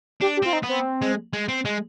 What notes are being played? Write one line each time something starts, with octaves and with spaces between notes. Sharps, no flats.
D4 G4
G4
C4 F4
D#4
B3
C4
G#3
G#3
C4
G#3